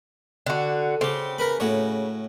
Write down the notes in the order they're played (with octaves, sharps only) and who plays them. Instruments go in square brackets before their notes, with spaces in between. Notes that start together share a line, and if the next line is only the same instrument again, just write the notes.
[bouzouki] D3 F#4
[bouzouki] C#3 [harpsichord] C4 G4
[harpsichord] A#4 B4 B5
A2 F#4 C#5